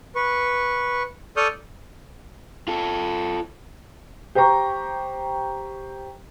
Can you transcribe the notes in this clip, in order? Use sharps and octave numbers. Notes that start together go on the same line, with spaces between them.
B4 C#6
A4 D5 C#6 D#6 F6 G6
F4 A4
G4 C5 G5 A#5 C#6